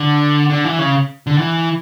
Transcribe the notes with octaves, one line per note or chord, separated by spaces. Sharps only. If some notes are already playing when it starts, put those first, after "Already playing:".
Already playing: D3
D3
E3
C#3
D3
E3